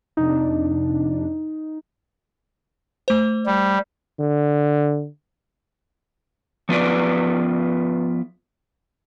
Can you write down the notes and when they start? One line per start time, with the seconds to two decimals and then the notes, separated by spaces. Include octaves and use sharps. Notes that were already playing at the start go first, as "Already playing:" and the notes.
0.17 F2 C3 D4 D#4
3.08 A3 C5
3.46 G3
4.20 D3
6.69 F3 B3 F4 B4 D5